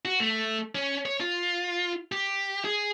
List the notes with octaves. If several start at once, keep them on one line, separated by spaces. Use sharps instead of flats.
F#4
A3
C#4
C#5
F4
G4
G#4